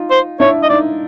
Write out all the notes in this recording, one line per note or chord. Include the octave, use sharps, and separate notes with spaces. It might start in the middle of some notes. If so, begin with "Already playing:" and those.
Already playing: D#4 F4
C5
D4 E4 C#5
D#5
D#4 D5